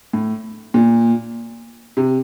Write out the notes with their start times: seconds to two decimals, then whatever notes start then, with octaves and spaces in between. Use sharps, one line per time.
0.13 A2
0.74 A#2
1.97 C3